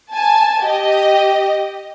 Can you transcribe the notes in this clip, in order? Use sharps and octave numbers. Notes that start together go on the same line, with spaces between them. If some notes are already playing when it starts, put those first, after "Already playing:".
G#5 A5
G4 D#5